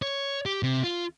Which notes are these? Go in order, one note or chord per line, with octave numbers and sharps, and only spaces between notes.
C#5
G4
C3
F4